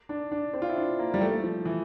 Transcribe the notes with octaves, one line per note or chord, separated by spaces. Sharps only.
D4
D4
C4
F4
E4
D4
A#3
G3
A3
F3
E3